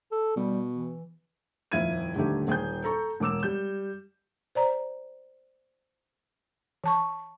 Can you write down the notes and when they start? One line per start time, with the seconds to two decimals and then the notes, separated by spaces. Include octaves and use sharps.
0.12 A4
0.36 B2 G3
0.74 E3
1.72 D#1 F2 E4 F5 G#6 D#7
2.15 D#1 D3 D#3 A3 G4
2.48 D#1 G#4 G5 G6
2.84 A4 A#5 C#6
3.20 E1 A#4 D6 E6 E7
3.43 G3 G6
4.55 C5 D5 A#5
6.84 E3 A5 C#6